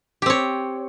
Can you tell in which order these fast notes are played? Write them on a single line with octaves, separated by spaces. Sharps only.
G4 C4 C#5